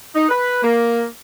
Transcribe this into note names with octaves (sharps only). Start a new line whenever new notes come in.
D#4
B4
A#3